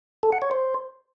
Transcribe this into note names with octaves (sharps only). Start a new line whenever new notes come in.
A4
F#5
C#5
C5